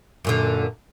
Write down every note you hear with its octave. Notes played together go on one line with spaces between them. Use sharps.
F#2 A#2 D3